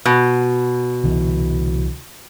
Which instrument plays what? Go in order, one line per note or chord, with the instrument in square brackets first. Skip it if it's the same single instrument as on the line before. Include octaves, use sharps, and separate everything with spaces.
[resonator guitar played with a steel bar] B2
[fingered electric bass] C2 D3 E3